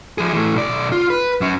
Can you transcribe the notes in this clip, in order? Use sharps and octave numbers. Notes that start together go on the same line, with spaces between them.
F3 G#4
E3 A3
B1 D5
F4
B4
F#3 C#4